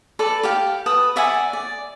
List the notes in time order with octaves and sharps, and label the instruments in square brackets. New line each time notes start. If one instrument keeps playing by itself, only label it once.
[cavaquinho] A4 B4 D5
G4 F5 G5
B4 A5 D#6
D5 E5 F#5 G#5
D5